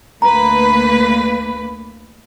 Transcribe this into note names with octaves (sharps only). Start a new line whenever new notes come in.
D2 A#3 B4 A#5